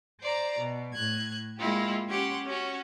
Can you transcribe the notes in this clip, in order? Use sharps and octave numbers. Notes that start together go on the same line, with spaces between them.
C5 D5 A#5
B2
A2 F#6 G#6
G#3 A#3 E4 F4 G4
C#4 G4 C#5 F#5 C6
C#4 F#4 C#5